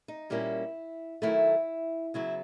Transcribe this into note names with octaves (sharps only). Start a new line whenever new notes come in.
D#4
A#2 G3 A#3 C#4 E4
D#3 F#3 A3 E4
C#3 F#3 B3 E4